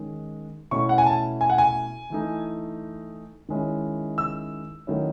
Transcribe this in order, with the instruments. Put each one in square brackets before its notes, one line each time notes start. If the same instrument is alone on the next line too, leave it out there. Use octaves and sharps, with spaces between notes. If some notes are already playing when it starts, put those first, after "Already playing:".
Already playing: [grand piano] D#3 G#3 C#4
B2 A3 C#4 E4 C#6
F#5
G#5
A5
G#5
F#5
G#5
E3 A3 D#4
D#3 G#3 C#4 E4
E6
D#3 F#3 A3 C#4 E4